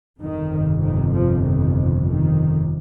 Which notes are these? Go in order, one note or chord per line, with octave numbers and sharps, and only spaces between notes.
G1 F2 C3 D#3
D#3
F3
D#3
D#3